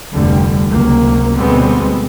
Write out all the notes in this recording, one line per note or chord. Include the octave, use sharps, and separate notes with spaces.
F1 D2 D3 G3
C#2 C3 F#3 A#3
D2 B2 G3 G#3 B3 C4